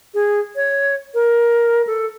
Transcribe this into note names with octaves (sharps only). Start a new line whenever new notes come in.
G#4
C#5
A#4
A4